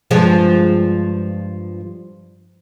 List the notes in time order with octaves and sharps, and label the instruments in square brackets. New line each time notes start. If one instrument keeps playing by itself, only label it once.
[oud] G2 F3 G#3